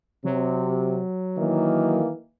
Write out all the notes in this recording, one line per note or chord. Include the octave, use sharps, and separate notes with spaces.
C3 F#3
D#3 E3 A#3